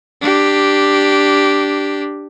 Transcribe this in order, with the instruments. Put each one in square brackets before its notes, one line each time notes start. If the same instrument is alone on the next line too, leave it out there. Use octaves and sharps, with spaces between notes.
[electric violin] D4 G4